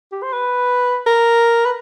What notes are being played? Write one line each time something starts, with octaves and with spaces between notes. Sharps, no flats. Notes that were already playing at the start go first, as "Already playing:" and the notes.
G4
C5
B4
A#4
B4